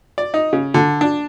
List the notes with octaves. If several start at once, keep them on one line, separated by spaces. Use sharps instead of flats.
D5
D#4
C#3
D3
D4